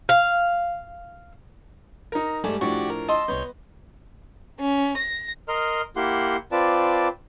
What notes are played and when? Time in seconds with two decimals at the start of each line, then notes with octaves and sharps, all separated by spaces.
0.09 F5
2.12 D#4 A#4 A#5
2.44 G#2 G3 A3 A4 D5 G#5
2.61 A2 F3 D4 F#4 G4 D5 C#6
2.90 A#4
3.08 D#5 A5 C6 E6
3.28 C2 B3 C#5 G6
4.60 C#4
4.98 A#6
5.48 A#4 D#5 C6 F6
5.96 A#3 E4 G4 F#5 C6
6.52 C4 F4 B4 D5 A5 D6